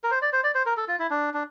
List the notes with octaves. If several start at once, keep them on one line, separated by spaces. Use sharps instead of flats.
A#4
C5
D5
C5
D5
C5
A#4
A4
F4
E4
D4
D4